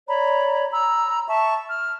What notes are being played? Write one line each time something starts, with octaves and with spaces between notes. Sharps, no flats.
C#5 D5 A#5 B5
A#5 B5 E6
E5 A5 C#6
F6